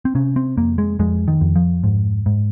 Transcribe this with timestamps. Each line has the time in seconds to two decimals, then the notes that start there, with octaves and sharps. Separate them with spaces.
0.05 C4
0.15 C3 C#4
0.36 C4
0.57 F2 A#3
0.78 G#3
0.99 F2 G#3
1.28 D#3
1.41 F2
1.56 F3
1.83 G#2
2.26 G#2